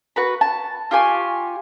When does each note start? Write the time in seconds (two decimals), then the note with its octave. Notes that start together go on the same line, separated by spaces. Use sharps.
0.16 F#4 B4 B5
0.41 A5
0.91 F4 G4 G#5 C#6